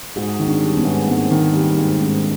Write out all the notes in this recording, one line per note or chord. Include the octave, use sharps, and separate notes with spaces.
G#2 F#4 G#4
D#3
C4 D4
G3
B3 C#4
G#2
G#2 A#3 C4
D#3
G3
G#2
G#2 C4 D4